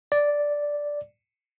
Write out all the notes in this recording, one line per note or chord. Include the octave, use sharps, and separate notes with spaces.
D5